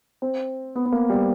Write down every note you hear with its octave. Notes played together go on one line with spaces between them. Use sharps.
C4
B3
B3
A#3
G3